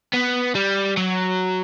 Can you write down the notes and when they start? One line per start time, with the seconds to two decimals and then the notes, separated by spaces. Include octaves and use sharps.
0.13 B3
0.55 G3
0.97 F#3